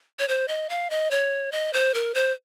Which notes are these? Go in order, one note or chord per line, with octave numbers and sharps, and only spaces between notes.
C#5
C5
D#5
F5
D#5
C#5
D#5
C5
A#4
C5